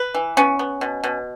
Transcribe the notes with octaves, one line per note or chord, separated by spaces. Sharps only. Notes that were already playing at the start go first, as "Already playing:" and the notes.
Already playing: B4
E3
B3 C#4
B3
B2
B2